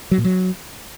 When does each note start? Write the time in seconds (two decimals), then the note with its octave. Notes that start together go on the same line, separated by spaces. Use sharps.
0.11 F#3
0.18 A#2
0.25 F#3